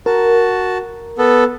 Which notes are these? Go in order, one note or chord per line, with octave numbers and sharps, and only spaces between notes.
F#4 A#4 A5
B3 A4